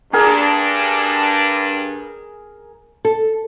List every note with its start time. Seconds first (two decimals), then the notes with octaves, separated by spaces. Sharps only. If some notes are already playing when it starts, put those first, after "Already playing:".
0.13 G2 D4 G#4 A#4
3.05 A4